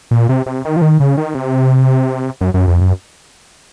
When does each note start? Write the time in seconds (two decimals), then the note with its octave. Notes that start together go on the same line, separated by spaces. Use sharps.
0.11 A#2
0.29 C3
0.46 C3
0.65 D#3
0.77 F3
0.82 D#3
1.00 C#3
1.17 D#3
1.35 C3
2.41 F#2
2.54 F#2
2.68 F2
2.81 F#2